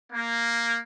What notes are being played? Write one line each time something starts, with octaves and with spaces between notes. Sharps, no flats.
A#3